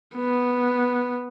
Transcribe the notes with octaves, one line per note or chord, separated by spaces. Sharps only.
B3